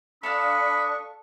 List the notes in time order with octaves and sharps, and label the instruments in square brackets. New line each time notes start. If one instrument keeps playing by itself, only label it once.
[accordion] D4 C#6 [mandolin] A4 F5 A5 [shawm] B5 [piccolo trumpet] D#6